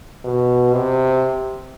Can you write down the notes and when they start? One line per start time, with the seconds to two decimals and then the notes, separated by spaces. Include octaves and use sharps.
0.25 B2
0.74 C3